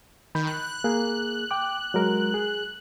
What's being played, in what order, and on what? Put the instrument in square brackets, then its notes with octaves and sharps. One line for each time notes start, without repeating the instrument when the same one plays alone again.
[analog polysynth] D#3 [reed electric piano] B5 G6
[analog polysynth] F#6
[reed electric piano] A#3 G#4
G5 D6
F#3 G#3 A#4
G#4